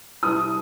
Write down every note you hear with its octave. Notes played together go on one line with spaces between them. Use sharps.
C2 D#6